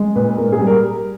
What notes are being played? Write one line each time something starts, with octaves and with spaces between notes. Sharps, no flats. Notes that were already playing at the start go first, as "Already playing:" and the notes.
Already playing: G#3
A#2 B4
G#2 A#4
G#4
G3
A#4